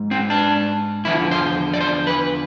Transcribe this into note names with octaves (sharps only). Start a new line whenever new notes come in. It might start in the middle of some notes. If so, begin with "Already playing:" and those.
Already playing: G#2 G#3
C4
D4
E2 D3 F3 E4
C5
D5
C5
B4